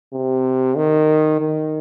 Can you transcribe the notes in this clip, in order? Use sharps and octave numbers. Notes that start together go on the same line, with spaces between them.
C3
D#3
D#3